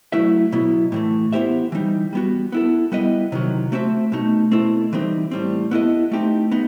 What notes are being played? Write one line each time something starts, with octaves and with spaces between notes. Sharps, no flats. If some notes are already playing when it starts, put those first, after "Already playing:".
F#3 A3 E4 B4 E5
B2 F#3 B3 E4
A2 E3 A3
B3 E4 G4 C5 E5
E3 G3 D#4
G3 B3 F#4
B3 E4 A4
G3 B3 E4 B4 D#5
C3 D#3 F#3
A3 C4 F#4 C5 E5
B2 A3 D#4
B2 A3 C4 E4 A4
E3 G3 C4 D#4
A2 G3 C4
B3 E4 A4 D#5
A3 C4 D#4 G4
B3 D#4